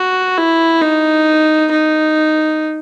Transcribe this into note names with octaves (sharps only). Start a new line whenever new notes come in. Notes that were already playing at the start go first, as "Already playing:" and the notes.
Already playing: F#4
E4
D#4
D#4